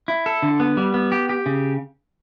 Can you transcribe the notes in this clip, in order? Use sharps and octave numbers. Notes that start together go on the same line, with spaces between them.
E4
A4
D3
B3
G3
B3
G4
G4
C#3